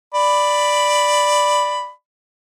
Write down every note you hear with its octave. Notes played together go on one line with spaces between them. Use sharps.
D5 B5